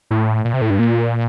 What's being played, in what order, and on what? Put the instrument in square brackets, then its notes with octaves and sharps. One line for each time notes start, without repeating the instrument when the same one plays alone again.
[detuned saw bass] A2
A#2
C3
A2
G2
A#2